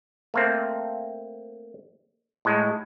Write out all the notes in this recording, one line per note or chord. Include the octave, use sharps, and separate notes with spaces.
A3 A#3 C4
A2 G#3